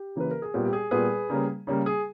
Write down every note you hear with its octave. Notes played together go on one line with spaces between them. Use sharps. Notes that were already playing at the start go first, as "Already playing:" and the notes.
Already playing: G4
C#3 E3 A#3 B4
A#4
G#4
A#2 G3 B3 G4
G4
G#4
A#2 G3 B3 G#4 B4
C#3 G3 A#3
C#3 G3 A#3
G#4